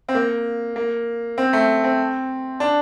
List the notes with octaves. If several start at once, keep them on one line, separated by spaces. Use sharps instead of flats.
C4
A#3
A#3
C4
A3
C4
D4